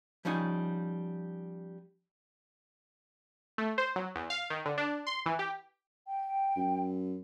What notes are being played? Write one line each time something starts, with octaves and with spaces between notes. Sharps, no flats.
F3 G3 C#4 D#4 G#5
A3
C5
F#3
E2
F5
D#3
D3
D4
C6
E3
G4
G5
F#2